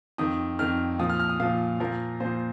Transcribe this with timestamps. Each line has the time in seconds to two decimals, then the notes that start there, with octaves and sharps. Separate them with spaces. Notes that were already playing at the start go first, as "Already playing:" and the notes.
0.18 F2 D#3 D#6
0.59 F2 D#3 F6
0.99 A#2 F3 D#6
1.10 F6
1.20 F6
1.29 D#6
1.40 A#2 F3 F5
1.80 A#2 F3 A#4
2.20 A#2 F3 C5